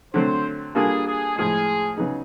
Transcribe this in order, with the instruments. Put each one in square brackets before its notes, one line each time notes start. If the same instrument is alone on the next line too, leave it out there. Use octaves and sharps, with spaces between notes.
[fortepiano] D3 F#3 A3 C4 [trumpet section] C5
[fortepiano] G3 A#3 D4 F4 A4 [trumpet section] G#4
[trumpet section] G#4
[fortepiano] A2 F3 G#3 [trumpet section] G#4
[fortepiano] C#3 F#3 B3 D#4 G#4